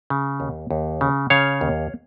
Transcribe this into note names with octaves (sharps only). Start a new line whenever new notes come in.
C#3
D#2
D#2
C#3
C#3 C#5 F5
D#2